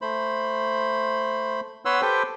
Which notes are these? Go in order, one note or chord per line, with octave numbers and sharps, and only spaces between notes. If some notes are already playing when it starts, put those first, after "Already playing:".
A3 C5 B5
B3 B4 C#5 F#5 C6 E6
G4 A4 B4 C5 G5